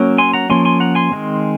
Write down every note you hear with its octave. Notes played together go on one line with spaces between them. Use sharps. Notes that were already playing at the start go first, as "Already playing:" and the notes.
Already playing: F#3 A#3 C#4
G#5 C6
F#5 A#5
F3 A#3 C#4 G#5 C6
G#5 C6
F#5 A#5
G#5 C6
D#3 G#3 C4